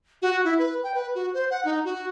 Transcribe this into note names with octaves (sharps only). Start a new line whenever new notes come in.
F#4
E4
B4
G5
B4
F#4
C5
F#5
D#4
F#4